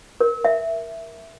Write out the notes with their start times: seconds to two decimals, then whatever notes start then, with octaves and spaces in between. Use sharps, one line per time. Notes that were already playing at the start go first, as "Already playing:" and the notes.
0.20 A#4
0.45 E5